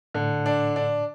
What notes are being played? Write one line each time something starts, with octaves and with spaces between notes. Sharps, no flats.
A2 D3
D4
D4